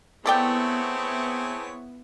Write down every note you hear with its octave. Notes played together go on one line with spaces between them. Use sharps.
A3 B3 C4 E4 G#4 C#5 D5 G5